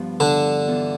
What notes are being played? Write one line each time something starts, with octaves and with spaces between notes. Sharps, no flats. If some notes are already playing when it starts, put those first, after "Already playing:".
Already playing: G2 F3 B3
D3 D4
E3 B3 F4 A4